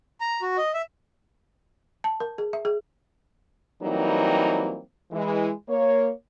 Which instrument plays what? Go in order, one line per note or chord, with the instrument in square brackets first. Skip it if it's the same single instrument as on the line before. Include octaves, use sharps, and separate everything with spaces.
[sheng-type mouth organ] A#5
F#4
D#5
E5
[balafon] A5
A#4
G#4
E5
G#4
[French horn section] E3 F#3 G3 A#3 C4 D#4
E3 G#3
A#3 C#5